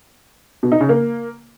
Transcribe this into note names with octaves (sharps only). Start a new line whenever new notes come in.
B2
D#4
C#3
A#3